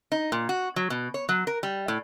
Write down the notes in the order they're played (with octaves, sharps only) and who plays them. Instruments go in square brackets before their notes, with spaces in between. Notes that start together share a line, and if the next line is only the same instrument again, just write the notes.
[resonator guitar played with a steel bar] D#4
A#2
F#4
F#3
B2
C#5
F#3
A#4
G3
A2